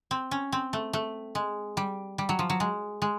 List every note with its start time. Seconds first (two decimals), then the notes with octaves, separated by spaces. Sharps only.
0.11 C4
0.31 C#4
0.52 C4
0.73 A3
0.93 A3
1.35 G#3
1.77 G3
2.18 G3
2.29 F#3
2.39 F3
2.50 F#3
2.60 G#3
3.02 G#3